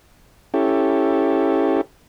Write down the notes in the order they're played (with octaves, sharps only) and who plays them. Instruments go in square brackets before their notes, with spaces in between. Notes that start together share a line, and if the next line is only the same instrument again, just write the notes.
[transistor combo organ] C#4 E4 G4 A4